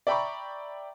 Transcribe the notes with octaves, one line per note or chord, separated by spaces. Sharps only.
D5 E5 G5 A#5 B5 C#6